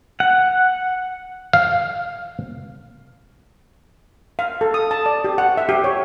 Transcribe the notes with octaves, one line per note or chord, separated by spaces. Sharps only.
F#5
F5
F5
A4
D#6
A5
D5
G4
F#5
E5
G4
C#5